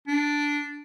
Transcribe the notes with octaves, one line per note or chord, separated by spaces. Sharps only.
D4